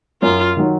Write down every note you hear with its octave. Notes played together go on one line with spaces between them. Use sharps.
F#2 F4
D#3 F#3